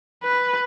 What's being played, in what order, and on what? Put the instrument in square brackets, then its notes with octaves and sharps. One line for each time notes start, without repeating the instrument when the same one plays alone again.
[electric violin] B4